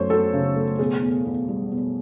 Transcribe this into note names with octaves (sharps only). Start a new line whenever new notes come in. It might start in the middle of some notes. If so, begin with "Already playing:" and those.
Already playing: F#2 A3 C5 C#5
F#3 A4
C#3
A3
B2 G#4
E2
E2
G3
B2